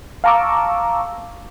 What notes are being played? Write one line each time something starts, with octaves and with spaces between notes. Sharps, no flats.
F5 A5 A#5 C#6 D6 E6